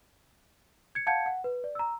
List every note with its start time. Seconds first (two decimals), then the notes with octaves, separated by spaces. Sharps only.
0.95 G#6 C#7
1.07 F5 F#5 A5 G6 G#6 C#7
1.26 F#5
1.44 B4
1.64 D5
1.75 A#5 E6